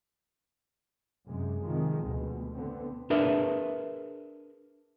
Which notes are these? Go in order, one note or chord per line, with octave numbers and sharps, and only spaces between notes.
F#2 C3 G#3
C3 D#3 F3 G#3
D2 B2
D3 B3 C4
D4 G#4 A#4 B4 E5